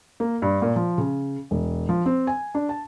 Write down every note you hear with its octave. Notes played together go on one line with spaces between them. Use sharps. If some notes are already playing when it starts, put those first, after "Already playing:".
A#3
G2
A#2
F3
C#3
E1
F3
C4
G#5
D4
A5